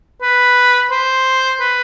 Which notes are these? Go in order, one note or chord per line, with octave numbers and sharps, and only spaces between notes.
B4
C5
B4